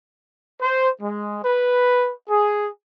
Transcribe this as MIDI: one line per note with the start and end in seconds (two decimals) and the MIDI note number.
0.62 0.91 72
1.02 1.40 56
1.44 2.13 71
2.30 2.69 68